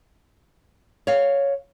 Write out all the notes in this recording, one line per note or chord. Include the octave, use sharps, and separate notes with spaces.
C#5 F5